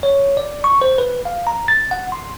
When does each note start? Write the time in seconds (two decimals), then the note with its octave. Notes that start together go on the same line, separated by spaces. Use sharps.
0.03 C#5
0.37 D5
0.64 C#6
0.82 C5
0.98 B4
1.25 F5
1.47 A#5
1.68 A6
1.91 F#5
2.12 C6